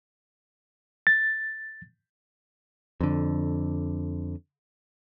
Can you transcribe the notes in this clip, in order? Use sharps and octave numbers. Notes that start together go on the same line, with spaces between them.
A6
F2 D3